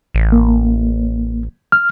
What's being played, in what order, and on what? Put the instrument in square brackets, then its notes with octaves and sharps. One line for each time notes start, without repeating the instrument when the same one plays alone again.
[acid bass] A1
[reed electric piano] A#3
F6